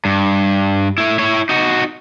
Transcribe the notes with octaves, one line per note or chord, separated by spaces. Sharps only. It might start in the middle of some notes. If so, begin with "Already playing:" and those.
G2
A3 E4
E4 C#5
D#4 F#4